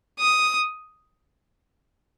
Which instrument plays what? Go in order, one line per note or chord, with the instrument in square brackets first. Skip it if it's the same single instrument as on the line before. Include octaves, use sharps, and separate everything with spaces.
[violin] D#6